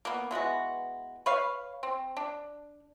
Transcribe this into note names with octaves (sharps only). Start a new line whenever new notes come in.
A#3 B3
E3 G#3 B3 F#4
B4 C#5 F5
C4
D4